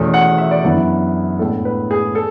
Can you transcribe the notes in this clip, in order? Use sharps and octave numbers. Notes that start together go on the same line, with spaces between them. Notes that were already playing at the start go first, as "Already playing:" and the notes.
Already playing: E2 B2 A3 C#4
F#5
E5
D5
F#2 E3 B3 D4 E5
A2 G#3 B3 D4 A4
B4
G#4
A4